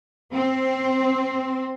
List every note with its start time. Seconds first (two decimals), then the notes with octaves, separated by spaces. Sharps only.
0.35 C4